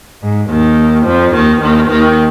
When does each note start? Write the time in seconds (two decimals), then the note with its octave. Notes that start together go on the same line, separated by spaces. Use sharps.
0.23 G#2
0.50 D#2 D#3
1.06 F2 F3
1.35 D#2 D#3
1.62 D#2 D#3
1.90 D#2 D#3